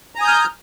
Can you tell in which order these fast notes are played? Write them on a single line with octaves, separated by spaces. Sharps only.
A#5 G#5 D#6 G6 F6